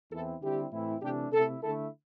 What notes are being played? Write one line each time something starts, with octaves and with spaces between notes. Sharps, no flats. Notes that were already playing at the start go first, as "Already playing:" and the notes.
E2 E3 C4 E4 A4
D3 G3 C4 E4 G4
A2 E3 C4 E4
C3 E3 A3 D4 G4
C3 A3 E4 A4
D3 A3 E4 A4